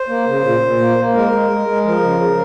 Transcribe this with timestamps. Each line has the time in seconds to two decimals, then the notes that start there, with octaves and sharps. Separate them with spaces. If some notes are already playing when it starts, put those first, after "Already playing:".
Already playing: C5
0.08 A#3
0.26 C#3
0.44 A#2
0.61 A#2
0.79 A#3
0.97 A#3
1.14 G#3 A#4
1.32 G#3
1.50 G#3
1.67 G#3
1.85 F3 A#4
2.02 C#3
2.21 C#3